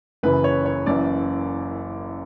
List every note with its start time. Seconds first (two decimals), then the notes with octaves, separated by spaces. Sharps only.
0.23 F#1 F#2 C#3 E3 B4
0.44 C#5
0.66 C#5
0.86 F#1 F#2 E3 D5